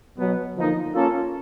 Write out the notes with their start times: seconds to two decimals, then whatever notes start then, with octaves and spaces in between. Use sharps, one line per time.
0.18 B2 F#3 B3
0.56 D3 F3 A#3 D#4
0.94 A#3 C#4 F4 A4